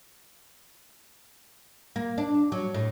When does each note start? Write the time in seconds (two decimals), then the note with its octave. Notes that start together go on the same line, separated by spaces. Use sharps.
1.96 A#3
2.18 D4
2.52 F#3
2.74 A2